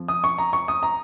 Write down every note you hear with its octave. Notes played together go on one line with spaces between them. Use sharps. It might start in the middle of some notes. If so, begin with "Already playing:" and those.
Already playing: F2 F3
D#6
C#6
A#5
C#6
D#6
A#5